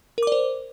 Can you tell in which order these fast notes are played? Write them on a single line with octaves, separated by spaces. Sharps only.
A#4 D6 D5 C5